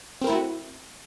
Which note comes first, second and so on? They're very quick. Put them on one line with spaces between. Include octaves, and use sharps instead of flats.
C4 A#4 E4 A3 F#4